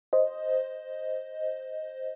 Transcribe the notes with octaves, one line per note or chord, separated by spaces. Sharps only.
C5 D#5